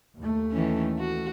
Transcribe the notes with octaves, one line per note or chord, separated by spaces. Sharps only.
D#2 A3
D#3 E3 C#4
F#4